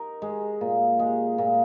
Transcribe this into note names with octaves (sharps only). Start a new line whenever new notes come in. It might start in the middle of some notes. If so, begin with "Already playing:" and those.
Already playing: D#4 A#4
G#3
A#2
G#3
A#2